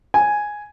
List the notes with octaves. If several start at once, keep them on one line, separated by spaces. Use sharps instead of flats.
G#5